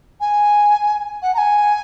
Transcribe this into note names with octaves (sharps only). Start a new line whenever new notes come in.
G#5
F#5
A#5
G#5